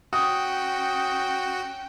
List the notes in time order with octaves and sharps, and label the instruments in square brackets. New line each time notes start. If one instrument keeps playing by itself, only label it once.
[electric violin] C#4 G5 [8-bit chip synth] F#4 [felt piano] D#6